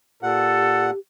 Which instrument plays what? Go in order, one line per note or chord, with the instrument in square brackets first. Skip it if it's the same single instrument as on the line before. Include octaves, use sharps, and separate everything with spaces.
[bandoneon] A#2 F#5 [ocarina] G4 [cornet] A4